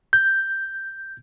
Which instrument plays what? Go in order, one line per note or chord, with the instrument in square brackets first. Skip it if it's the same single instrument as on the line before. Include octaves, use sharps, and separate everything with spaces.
[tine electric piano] G6